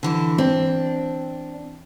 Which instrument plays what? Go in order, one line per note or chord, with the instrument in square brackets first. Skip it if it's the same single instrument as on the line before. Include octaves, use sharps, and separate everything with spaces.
[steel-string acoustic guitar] D3 E3 E4
[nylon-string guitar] C4 [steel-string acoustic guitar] D4